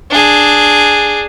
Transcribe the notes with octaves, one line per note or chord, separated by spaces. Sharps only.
D4 G#4